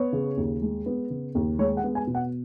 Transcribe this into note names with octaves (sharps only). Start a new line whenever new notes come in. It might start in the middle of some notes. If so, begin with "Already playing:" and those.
Already playing: B3 C#5
C#3
D#2
G#3
B3
C#3
D#2
G#3 C#5
F#5
B3
G#5
B2
F#5